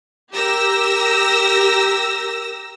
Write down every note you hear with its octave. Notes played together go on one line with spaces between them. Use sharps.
G4 A#4 E6 A#6